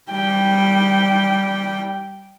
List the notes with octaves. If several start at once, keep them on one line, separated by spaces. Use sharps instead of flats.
G3 G5